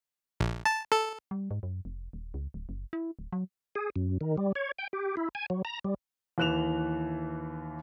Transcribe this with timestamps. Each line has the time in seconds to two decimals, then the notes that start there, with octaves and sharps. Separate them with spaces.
0.40 A#1
0.65 A5
0.92 A4
1.31 G3
1.51 G#2
1.63 F#2
1.85 F1
2.13 D#1
2.34 C#2
2.54 D1
2.69 F#1
2.93 E4
3.19 D1
3.32 F#3
3.75 G#4
3.96 F#2
4.21 D#3
4.38 G3
4.55 C#5
4.79 G5
4.93 G4
5.17 E4
5.35 G#5
5.50 F#3
5.65 A#5
5.84 G3
6.38 D#2 E3 F#6 E7 F7